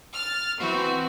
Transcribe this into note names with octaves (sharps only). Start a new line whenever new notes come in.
F6 A6
E3 C4 F#4 B4